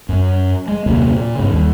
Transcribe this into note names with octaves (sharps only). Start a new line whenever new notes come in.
F#2
G#3
D#1 F#2 C3 A#3
A#2
G#2 C#3
D#2 G3